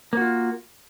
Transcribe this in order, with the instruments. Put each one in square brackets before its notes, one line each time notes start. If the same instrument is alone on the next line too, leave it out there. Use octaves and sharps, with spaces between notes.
[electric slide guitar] A#3
F#4
F4